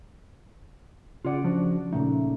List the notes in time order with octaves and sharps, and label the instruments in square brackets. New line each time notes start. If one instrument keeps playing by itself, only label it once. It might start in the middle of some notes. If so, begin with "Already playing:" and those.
[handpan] C#3 D5 [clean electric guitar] F4 G#4 F#5
[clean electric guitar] F3 D4 F#4
[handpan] A#2 C#3 A3 [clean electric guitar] D#4